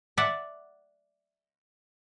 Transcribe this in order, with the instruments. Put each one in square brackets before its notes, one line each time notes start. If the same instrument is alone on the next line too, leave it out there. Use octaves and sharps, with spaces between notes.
[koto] D5 E5 F#5